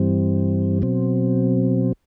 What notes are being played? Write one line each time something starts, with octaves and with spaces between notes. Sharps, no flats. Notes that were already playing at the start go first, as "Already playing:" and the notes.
Already playing: G2 E3 G3 C4
B2 F#3 C4